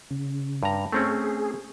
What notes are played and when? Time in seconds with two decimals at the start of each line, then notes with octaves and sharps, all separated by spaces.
0.11 C#3
0.63 G2 A#5
0.92 A3 C4 C#4 G#4